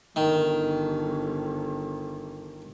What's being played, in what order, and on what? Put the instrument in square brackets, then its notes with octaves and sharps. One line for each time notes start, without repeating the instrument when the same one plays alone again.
[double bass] G1 [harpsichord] D#3